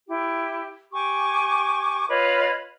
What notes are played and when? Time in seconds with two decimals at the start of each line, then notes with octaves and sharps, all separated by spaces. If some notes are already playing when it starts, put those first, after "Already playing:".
0.08 E4 G4
0.92 G4 G#5 C#6 D6
2.08 F4 B4 C#5 D#5